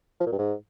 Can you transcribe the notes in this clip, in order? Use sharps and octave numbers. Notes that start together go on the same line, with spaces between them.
F3
A#2
G2
G#2